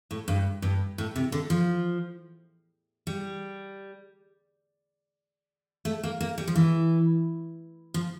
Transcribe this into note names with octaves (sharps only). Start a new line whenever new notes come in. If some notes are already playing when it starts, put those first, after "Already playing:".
A2
G2
G2
A2
C3
D3
F3
G3
A3
A#3
A#3
G3
F3
E3
F3